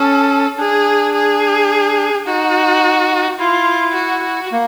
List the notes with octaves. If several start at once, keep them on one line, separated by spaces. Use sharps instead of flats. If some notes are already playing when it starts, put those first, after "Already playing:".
Already playing: C#4 A4
D4 G#4
G#4
D#4 F#4
E4 F4
F#4
F#4
A#3